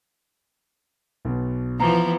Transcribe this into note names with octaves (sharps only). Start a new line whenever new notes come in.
B1 B2
E3 F3 B3 A#5